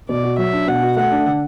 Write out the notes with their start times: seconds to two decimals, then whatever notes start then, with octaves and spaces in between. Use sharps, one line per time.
0.09 B2 D5
0.23 F#4
0.38 F#3 E5
0.53 D4
0.67 B2 F#5
0.82 F#4
0.96 A3 F#5
1.12 D4
1.26 D3